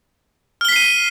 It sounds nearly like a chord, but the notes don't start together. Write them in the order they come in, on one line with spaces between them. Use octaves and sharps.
F6 G7 B6 C7 D#7